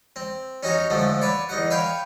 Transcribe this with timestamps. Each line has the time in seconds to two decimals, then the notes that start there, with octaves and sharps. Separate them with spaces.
0.16 C4
0.63 C#4 D#4 F#4 C#5
0.90 G#2 D3 F3 A3
1.21 B4 C#5 D5
1.49 E2 D#4 F#5
1.70 B4 C#5 F5 G5